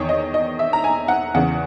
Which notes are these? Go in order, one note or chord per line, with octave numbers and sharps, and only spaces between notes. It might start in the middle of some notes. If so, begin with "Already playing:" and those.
Already playing: E2 D#3 C#5
D#5
D#5
E5
A#5
G#5
F#5
E2 C#3 E3 F#5